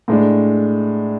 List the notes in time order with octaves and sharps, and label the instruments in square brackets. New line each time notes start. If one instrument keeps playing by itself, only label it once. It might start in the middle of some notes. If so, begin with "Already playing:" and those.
[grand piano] A2 G#3 D4